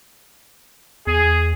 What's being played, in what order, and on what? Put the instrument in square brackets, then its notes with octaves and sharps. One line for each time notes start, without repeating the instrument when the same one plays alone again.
[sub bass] E2 [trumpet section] G#4